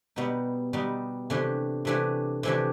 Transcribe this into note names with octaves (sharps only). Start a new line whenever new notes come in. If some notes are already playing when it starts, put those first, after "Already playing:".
B2 G3 B3 D#4
B2 G3 B3 D#4
C3 E3 A3 D4 G4
C3 E3 A3 D4 G4
C3 E3 A3 D4 G4